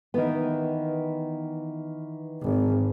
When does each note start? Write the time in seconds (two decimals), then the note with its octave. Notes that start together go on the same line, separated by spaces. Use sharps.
0.14 D#3 E3 B3
2.42 G#1